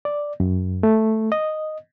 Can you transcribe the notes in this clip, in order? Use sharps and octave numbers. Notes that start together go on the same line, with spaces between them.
D5
F#2
A3
D#5